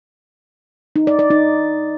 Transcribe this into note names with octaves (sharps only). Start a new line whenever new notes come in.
D#4
D5
D5
D#4